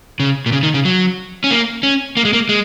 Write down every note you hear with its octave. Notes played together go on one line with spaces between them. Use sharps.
C#3
A#2
C#3
D#3
C#3
F#3
C#4
A#3
C#4
A#3
G#3
A#3
G#3